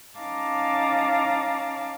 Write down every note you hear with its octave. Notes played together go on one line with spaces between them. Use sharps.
C#4 D#4 F5 A5 A#5 D6